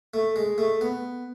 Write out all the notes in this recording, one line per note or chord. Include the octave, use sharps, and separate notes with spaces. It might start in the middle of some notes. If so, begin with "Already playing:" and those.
A3
G#3
A3
B3